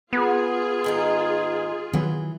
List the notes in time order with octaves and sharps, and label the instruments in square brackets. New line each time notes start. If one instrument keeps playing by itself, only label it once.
[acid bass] B3 [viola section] F4 G#4
[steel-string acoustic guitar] G#2 D#3 D#4
[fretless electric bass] D#3 F#3 B3 [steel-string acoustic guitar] E3